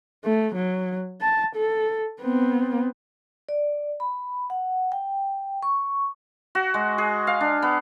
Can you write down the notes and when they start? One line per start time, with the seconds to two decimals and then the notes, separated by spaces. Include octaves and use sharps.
0.24 A3
0.55 F#3
1.21 A5
1.56 A4
2.21 B3 C4
3.49 D5
4.00 B5
4.50 F#5
4.92 G5
5.63 C#6
6.55 F#4
6.74 G#3
6.98 G#4
7.27 F5
7.41 D4
7.63 B3